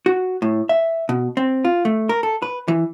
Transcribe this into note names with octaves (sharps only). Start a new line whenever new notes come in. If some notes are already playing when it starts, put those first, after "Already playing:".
F#4
A2
E5
B2
C4
F4
A3
A#4
A4
B4
E3